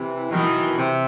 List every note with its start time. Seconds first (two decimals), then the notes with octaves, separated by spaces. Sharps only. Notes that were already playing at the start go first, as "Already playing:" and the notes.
Already playing: C3 E3
0.31 B2 D#3 E3
0.78 C3